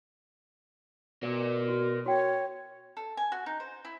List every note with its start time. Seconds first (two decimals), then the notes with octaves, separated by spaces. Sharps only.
1.23 B2 A#4 D5
1.68 F#4
2.06 F#4 C#5 G5
2.97 A4
3.17 G#5
3.32 F#4
3.46 D#4
3.60 C5
3.85 E4